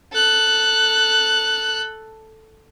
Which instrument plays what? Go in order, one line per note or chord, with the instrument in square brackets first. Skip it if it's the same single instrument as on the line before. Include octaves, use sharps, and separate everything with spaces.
[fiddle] A4 F#6